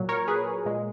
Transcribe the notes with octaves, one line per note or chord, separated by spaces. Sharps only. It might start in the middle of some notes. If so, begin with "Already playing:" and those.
Already playing: A#2 F#3
A#4 C#5
G#4 B4
A#2 G#3